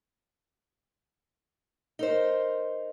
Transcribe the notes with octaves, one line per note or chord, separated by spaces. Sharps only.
D#4 A#4 C5